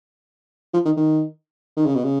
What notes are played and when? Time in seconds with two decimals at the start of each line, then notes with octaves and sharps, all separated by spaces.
0.74 F3
0.85 D#3
0.97 D#3
1.77 D#3
1.86 C#3
1.95 B2
2.04 C#3